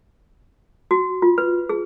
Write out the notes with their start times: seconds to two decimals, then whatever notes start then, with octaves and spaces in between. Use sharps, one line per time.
0.91 F#4
1.22 F4
1.38 B4
1.69 G#4